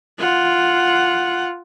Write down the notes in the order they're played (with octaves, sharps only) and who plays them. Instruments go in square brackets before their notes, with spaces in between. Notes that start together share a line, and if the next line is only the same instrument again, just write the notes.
[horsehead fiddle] F4 F#5